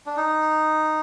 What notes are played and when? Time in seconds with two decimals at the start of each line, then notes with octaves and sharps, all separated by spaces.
0.06 D4
0.17 D#4